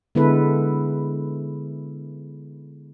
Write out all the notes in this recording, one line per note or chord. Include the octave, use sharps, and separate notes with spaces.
D3 G#3 B3 E4 A4 B4